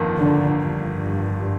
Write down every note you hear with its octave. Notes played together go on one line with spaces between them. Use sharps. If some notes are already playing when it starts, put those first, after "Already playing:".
Already playing: G1 F2 D#3 A#3
D3
G2